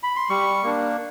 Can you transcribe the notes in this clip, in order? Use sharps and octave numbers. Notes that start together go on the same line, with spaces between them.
B5
C6
G3 C#6
A#3 D4